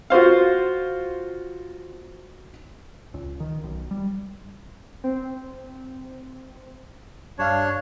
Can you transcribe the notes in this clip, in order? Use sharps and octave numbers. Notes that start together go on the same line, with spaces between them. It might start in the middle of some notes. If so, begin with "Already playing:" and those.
F4 F#4 C5 F5
C#2
D#3
B1
G3
C4
G2 D4 C#5 F5